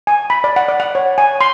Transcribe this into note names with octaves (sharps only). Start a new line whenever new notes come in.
G#5
B5
D5
F#5
D5
F#5
C#5
G#5
C6